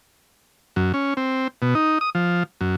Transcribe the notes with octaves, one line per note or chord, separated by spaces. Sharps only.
F#2
C#4
C4
B2
D#4
D#6
F3
F#2